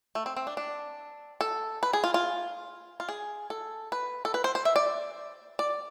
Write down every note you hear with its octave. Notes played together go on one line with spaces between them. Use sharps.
A3
C4
C4
D4
D4
A4
B4
G#4
F4
F4
F4
G#4
A4
B4
A4
B4
C5
C5
E5
D5
D5